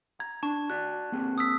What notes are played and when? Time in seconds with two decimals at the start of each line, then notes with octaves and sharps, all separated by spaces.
0.20 A#5 G#6
0.43 D4 A5 C#6
0.70 F#4 D5 F#6
1.12 A#3 C4 G#4
1.38 D#6 E6 B6